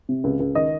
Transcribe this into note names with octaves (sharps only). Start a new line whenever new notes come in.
C3
C#2
C#2
D#3 D#5